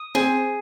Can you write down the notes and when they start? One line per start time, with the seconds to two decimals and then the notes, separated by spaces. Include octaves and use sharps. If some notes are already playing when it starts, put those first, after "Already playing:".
Already playing: D#6
0.15 C4 G#4